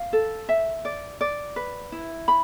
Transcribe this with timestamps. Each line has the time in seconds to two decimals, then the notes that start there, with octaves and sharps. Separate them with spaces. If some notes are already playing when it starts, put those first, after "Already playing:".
Already playing: F5
0.13 A4
0.49 E5
0.85 D5
1.21 D5
1.56 B4
1.92 E4
2.28 B5